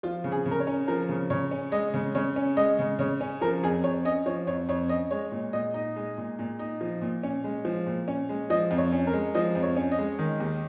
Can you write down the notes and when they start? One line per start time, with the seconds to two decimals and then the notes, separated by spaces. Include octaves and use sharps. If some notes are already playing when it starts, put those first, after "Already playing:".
0.03 F3 F4
0.24 C#3
0.32 G#4
0.46 C#3
0.51 A#4
0.60 C#5
0.67 C#4
0.88 F3 A#4
1.09 C#3
1.30 C#3 C#5
1.51 C#4
1.72 G#3 D#5
1.94 C#3
2.15 C#3 C#5
2.36 C#4
2.57 G#3 D#5
2.79 C#3
2.99 C#3 C#5
3.21 C#4
3.41 F3 A#4
3.63 F2 G#4
3.84 F2 C#5
4.05 C#4 D#5
4.26 F3 C#5
4.47 F2 C#5
4.69 F2 C#5
4.89 C#4 D#5
5.11 G#3 C#5
5.32 A#2
5.53 A#2 D#5
5.74 D#4
5.96 G#3
6.18 A#2
6.39 A#2
6.59 D#4
6.81 F3
7.01 A#2
7.23 C#4
7.44 G#3
7.65 F3
7.86 A#2
8.08 C#4
8.29 G#3
8.50 F3 D#5
8.71 F2
8.78 C#5
8.92 C#4
9.07 A#4
9.13 G#3
9.35 F3 D#5
9.55 F2
9.63 C#5
9.76 C#4
9.92 D#5
9.99 G#3
10.19 D#3
10.40 D#2